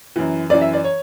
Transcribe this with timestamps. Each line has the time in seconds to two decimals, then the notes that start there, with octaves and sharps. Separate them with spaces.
0.16 F#2 E3
0.50 F#2 D5
0.54 E3
0.61 E5
0.73 D5
0.84 C#5